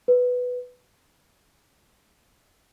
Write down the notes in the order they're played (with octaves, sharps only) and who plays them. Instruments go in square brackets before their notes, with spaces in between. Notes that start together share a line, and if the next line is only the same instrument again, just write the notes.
[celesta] B4